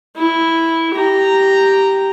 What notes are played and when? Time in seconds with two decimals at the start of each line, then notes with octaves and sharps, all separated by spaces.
0.17 E4
0.95 G4 A#5